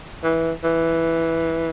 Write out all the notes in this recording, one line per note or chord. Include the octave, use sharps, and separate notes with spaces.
E3
E3